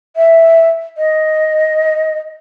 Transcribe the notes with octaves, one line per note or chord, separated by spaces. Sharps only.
E5
D#5